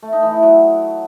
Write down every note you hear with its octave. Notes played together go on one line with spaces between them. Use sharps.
A3
D#4
E3
E4
F#3